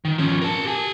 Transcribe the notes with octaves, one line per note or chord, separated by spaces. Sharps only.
D#3
F3 C#4
A#4 A5
G4 G#5